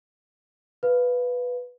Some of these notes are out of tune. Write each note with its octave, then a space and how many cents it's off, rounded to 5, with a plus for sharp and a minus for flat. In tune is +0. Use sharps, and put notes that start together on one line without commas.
B4 +0 F5 +0